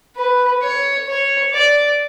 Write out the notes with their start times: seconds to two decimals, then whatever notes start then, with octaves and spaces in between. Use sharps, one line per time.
0.16 B4
0.63 C#5
1.08 C#5
1.53 D5